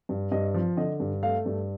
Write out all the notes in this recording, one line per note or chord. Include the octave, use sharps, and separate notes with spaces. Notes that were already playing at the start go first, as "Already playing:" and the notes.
G2
G2 D#5
F3
D3 D#5
G2
A3 F5
G2